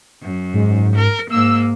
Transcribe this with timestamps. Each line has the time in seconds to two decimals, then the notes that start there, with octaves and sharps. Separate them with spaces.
0.22 F#2
0.53 G#2
0.96 A#4
1.30 G#2 A#3 E6